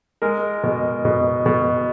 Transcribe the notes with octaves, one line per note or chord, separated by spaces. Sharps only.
G#3 A#4
B2
B2
B2